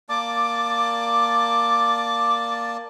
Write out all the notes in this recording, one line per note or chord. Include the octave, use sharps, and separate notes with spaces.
A#3 D5 A5 D6